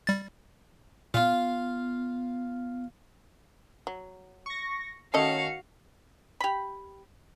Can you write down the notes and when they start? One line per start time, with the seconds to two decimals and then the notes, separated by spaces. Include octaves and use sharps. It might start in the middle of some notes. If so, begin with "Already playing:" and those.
0.07 G3 A6
1.14 A#2 B3 F4 F5
3.87 F#3
4.46 C#6 A#6
5.14 D#3 A3 C#4 F#4 A4 D#5 F5 C#7
6.40 G4 B5